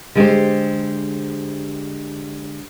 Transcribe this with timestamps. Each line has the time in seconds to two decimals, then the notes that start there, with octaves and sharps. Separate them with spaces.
0.15 D3 G#3 G4 C5